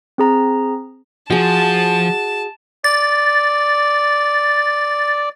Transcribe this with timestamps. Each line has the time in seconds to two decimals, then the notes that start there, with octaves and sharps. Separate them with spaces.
0.18 C4 G#4 A#5
1.30 F3 F#4 G#4 A5
2.84 D5 A6